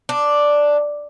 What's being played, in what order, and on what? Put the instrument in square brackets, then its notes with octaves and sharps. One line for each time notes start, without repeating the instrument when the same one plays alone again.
[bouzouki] D4